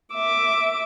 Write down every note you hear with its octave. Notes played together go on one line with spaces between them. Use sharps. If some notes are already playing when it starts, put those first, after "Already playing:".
E5 D6